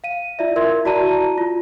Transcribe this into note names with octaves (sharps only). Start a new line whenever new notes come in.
F5 D#7
E4 F4 D5 E5
A#4 E5 C6 G#6
E4 F#4 D5 A5 A#5 D#7
F4